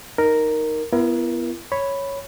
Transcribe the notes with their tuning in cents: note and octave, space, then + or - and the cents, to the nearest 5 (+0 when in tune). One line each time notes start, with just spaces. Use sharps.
D#4 +0 A#4 +0
B3 +0 E4 +35 A#4 +30
C#5 +0 B5 +0